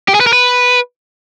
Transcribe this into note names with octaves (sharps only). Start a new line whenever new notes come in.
G4
G#4
B4
A#4
B4